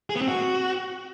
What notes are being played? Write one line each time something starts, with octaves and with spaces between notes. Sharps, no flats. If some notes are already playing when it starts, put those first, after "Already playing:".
G#4
B3
C4
F#4